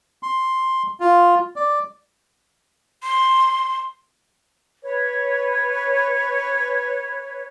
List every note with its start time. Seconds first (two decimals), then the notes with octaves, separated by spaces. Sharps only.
0.23 C6
1.00 F4
1.56 D5
3.03 C6
4.83 B4 C#5